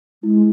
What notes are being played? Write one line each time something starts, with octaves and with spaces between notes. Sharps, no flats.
G#3 E4